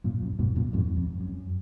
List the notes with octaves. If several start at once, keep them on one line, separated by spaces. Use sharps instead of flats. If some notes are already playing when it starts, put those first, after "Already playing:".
F#2 A#2
F#2
G#2 B2
F#2 A#2
F2 G#2
F2
F#2